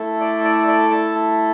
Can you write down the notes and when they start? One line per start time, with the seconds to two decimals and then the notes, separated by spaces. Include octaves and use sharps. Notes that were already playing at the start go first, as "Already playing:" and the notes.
Already playing: A3 E4 A4
0.20 D5
0.44 D5
0.68 D5
0.91 A5